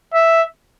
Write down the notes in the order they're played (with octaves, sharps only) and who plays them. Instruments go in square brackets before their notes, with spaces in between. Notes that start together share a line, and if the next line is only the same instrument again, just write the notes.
[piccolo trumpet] E5